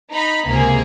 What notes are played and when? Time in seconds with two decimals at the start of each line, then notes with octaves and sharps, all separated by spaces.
0.11 D#4 A#5 B5
0.47 C#2 C3 A#3 G#4 A#4